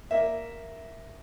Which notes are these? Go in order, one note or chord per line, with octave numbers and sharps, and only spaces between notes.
A#3 E5